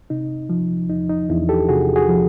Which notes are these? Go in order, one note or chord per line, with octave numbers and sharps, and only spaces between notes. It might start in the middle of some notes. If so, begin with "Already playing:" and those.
C3 D#4
F3
E2 D#4
D#4
E2 D4 E4
G4 A4
C3 F#4 G#4
F#4 G#4
F3